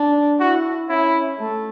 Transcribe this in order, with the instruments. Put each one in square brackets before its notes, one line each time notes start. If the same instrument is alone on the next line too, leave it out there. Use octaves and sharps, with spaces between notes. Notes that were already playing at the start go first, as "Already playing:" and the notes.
Already playing: [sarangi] D4
[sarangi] E4 [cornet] F#4
[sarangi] C#4 [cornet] E4
[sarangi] A3